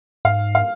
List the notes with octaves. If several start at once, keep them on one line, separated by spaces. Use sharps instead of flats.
G#2 F5
F5